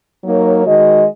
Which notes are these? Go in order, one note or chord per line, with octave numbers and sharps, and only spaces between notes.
F#3 A#3 D#4 A#4 C#5
D#3 G#3 F#4 D#5